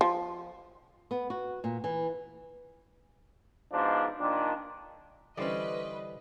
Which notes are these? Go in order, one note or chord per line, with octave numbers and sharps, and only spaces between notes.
F3
B3
F#4
A#2
E3
G#2 B2 F3 D4
A#2 D#3 D4
D3 E3 G3 C#4 B4 C5 D5 D#5